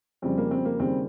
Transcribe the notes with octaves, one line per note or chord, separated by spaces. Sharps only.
F2 C#3 G3 C4
A#3
C4
A#3
D#2 C#3 G3 C4